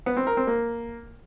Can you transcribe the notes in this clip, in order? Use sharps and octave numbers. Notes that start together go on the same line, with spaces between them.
B3
C4
A#4
C4
A#3